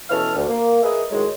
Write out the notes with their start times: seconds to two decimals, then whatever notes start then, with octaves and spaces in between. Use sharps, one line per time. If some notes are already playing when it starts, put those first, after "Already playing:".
0.10 B2 E3 C#4 A4 F6
0.35 D2
0.48 A#3
0.83 G#4 A#4 B4 D#5 E5
1.11 A2 D#3 F#3 G#3